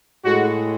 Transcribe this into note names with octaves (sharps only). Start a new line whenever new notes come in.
A2 G#3 F#4